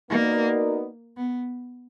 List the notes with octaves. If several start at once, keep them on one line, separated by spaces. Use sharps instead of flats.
A#3 B3 D#4 F#4 A#4 D5
B3